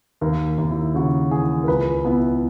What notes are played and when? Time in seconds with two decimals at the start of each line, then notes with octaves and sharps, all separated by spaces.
0.21 D#2 A#4
0.58 D#2
0.71 E4
0.94 C#3 F#4
1.31 E3 G#4
1.64 A#4
1.68 C#2 B4
2.05 B3 E4